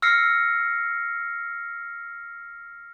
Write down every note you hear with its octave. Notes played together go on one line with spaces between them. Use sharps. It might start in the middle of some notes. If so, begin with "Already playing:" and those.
E6 F6 A#6 C7 C#7